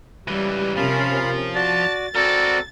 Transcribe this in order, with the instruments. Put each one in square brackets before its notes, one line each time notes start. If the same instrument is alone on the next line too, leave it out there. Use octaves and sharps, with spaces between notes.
[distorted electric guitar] C#2 E3 [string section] G3
[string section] C3 C#4 A#4 [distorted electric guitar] F3 [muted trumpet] F4 [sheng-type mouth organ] F5 B5
[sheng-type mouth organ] F#4 D5 [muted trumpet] A5 [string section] A6
[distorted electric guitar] C4 A#4 [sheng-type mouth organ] F#4 D5 F#5 [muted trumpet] A4